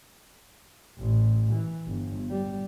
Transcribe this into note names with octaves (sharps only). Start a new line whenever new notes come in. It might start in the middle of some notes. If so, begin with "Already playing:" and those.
A1
E3
G1
G3